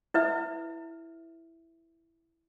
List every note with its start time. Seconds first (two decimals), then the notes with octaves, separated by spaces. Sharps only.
0.14 E4 B4 E5